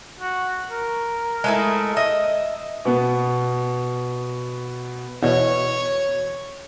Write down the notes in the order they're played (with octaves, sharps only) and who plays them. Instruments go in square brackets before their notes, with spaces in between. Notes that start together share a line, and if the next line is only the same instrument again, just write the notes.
[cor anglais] F#4
A#4
[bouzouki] G#3 A3 E4
D#5 E5
[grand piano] B2 B3
[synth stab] E2 B2 [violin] C#5